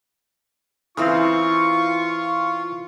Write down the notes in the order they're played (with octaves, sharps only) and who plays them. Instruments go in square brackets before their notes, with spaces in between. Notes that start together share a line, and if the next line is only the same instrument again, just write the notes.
[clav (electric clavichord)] C#3 C4 [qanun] E3 C5 F5 [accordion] F4 [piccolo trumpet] C#6